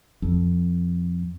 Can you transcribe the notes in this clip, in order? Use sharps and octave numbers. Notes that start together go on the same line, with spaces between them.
F2